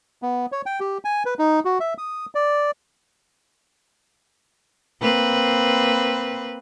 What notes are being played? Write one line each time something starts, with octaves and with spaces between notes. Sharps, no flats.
B3
C#5
G5
G4
G#5
B4
D#4
F#4
E5
D#6
D5
A#3 C4 B4